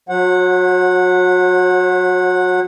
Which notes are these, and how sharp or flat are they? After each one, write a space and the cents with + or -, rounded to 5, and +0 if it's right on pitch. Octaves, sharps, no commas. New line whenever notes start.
F#3 -25 C5 +45 F#5 -10